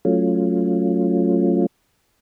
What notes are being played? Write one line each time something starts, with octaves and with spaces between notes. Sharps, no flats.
F#3 A3 C#4 F4